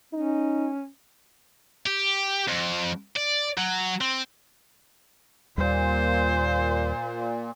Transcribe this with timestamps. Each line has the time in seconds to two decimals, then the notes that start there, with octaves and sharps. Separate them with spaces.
0.14 C#4 D#4
1.86 G4
2.48 F2
3.17 D5
3.58 F#3
4.01 C4
5.58 D#2 A#2 G3 C5